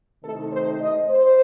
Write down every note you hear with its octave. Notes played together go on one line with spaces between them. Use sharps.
C3 D#3 A3 D#4 A4
C5
D#5
C5